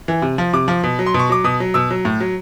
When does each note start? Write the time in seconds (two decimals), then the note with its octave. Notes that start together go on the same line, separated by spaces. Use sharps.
0.08 E3
0.22 C3
0.38 F3
0.53 C3 D6
0.68 F3
0.83 B2
0.99 F#3
1.06 C6
1.14 B2
1.19 C#6
1.29 F#3 D6
1.44 B2 D#6
1.60 F#3
1.74 B2 E6
1.91 F#3
2.05 A2
2.20 F#3